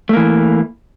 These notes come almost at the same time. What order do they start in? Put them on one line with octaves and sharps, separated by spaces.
A3 A#3 E3